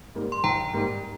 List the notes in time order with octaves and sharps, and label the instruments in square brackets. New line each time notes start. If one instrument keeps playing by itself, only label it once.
[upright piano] G#2 G3 A#3
[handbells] C6
[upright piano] A#1 [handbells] G5 A#5
[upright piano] G#2 G3 A#3